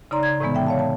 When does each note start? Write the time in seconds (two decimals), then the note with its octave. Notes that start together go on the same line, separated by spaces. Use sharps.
0.11 C#3 D#4 D5 A#5 C6
0.23 G#6
0.40 A2 C3 E3 G#3 B3
0.54 E5 G5
0.66 C#5 F5 A5
0.79 A5